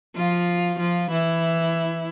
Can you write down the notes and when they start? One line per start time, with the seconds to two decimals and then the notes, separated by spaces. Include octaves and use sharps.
0.16 F3 F4
0.79 F3 F4
1.10 E3 E4